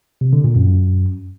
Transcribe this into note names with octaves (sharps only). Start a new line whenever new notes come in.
C3
D3
A#2
F#2